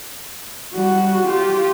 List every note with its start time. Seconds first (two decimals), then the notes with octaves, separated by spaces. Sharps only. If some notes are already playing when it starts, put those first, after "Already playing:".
0.74 G3 F#4
1.27 F4 G4